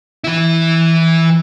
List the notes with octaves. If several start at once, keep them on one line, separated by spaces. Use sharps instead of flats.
E3 E4